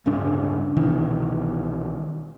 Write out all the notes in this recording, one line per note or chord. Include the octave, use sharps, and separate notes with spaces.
D1 G2 C#3 D4
C2 B2 D#3 E3